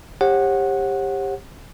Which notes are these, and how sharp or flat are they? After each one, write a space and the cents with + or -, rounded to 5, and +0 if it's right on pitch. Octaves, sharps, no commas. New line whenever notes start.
G4 +20 C#5 -45 F#5 -5